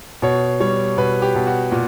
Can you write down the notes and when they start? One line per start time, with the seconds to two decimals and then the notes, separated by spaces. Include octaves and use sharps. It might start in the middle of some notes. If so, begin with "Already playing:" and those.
0.22 B2 C#5
0.60 G3 C#5
0.97 B2 B4
1.22 G4
1.35 B2
1.47 F#4
1.72 A#2 F#4